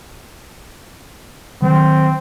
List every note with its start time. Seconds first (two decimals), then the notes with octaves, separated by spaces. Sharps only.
1.62 D#3 F#3 C4